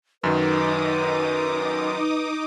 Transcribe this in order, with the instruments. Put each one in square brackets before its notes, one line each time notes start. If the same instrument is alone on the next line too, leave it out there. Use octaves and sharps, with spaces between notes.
[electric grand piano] F#2 D#3 F#3 [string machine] D#4 D6 D#6 [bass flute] B4